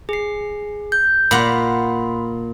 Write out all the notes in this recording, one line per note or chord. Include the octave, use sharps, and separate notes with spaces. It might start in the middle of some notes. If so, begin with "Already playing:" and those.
G#4 C7
G6
A#2 F#5 B5 C6